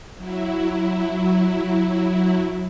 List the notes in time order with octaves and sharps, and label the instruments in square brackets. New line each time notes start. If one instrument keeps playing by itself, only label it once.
[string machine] F#3 E4